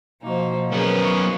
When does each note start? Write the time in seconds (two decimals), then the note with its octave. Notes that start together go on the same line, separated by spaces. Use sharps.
0.23 B2 F3 A#3 D#4 C5
0.72 F#2 B3 C#4 G#4 A#4 B4
1.02 D#4 F5 C#6